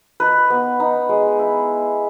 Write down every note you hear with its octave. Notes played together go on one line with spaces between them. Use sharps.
D#4 B4
B3
D#4
G#3
E4